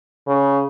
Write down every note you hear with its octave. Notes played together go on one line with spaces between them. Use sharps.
C#3